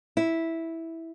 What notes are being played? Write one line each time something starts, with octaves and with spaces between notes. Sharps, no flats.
E4